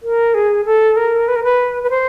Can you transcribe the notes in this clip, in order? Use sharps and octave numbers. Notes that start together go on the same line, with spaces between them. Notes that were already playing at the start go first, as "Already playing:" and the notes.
A#4
G#4
A4
A#4
B4
A#4
B4
B4
C5